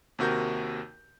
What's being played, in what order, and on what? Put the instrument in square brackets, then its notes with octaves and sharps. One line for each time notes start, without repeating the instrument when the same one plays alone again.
[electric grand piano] D#2 C3 F#4 A#4 G6